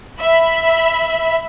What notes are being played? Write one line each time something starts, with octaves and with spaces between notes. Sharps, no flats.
E5 B5